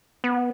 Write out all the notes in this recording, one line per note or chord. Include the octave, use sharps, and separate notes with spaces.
B3